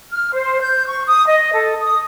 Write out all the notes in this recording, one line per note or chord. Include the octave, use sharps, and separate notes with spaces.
F6
C5
G6
C#6
D#6
D#5
A4
D#6